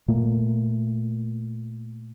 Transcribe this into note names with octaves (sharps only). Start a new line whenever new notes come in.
A#2 A3 A#3